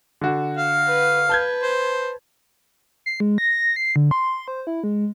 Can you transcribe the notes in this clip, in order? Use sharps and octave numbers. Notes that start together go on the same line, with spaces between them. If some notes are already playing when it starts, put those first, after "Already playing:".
D3 F#4
F5
B4
B4 A5 G6 G#6
C5
C7
G#3
A#6
C7
D3
C6
C5
E4
G#3